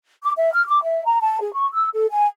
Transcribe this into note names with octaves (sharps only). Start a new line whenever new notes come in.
D6
E5
F6
D6
E5
A#5
A5
G#4
C#6
E6
A4
G#5